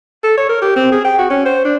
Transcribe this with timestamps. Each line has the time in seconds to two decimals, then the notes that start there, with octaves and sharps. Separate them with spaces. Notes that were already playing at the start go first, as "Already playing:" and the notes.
0.24 A4
0.38 C#5
0.49 A#4
0.62 G4
0.76 C4
0.92 G#4
1.05 G5
1.18 F#4
1.30 C#4
1.46 C5
1.65 D4